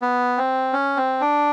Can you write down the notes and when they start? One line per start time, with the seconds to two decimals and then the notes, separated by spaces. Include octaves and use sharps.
0.02 B3
0.37 C4
0.73 C#4
0.97 C4
1.21 D4